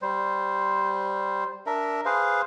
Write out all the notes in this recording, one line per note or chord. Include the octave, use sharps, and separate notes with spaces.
G3 C5
D4 A#4 E5
G#4 B4 C5 F5